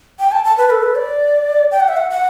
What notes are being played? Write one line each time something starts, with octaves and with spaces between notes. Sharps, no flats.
G5
A5
A5
B4
A4
B4
D5
G5
F#5
E5
F#5
F#5